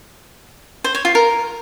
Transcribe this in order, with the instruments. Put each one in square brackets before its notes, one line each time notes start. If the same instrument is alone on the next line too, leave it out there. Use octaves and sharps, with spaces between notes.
[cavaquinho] C5
C#5
F4
A#4